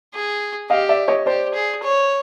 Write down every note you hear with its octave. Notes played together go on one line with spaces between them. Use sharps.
G#4
G4 D#5 F5
D5 E5
C#5 D#5
G4 C5 D5
G#4
C#5